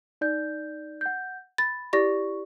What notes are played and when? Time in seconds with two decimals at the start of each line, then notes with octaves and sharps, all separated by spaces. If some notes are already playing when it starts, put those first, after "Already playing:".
0.21 D#4 D5 G6
1.01 F#5 G6
1.58 B5 A6
1.93 E4 G4 D5 C#6 A#6